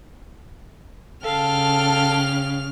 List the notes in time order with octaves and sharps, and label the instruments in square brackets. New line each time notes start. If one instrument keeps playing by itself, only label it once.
[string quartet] C#3 F6 [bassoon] A4 [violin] F5 G5 [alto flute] A5